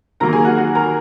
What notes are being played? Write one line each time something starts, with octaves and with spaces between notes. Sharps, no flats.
D#3 F#3 A#3 A#4 A#5
G#4 G#5
F#4 F#5
F#4 F#5
A#4 A#5